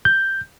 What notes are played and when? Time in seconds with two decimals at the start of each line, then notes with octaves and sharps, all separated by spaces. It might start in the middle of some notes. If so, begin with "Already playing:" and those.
0.05 G6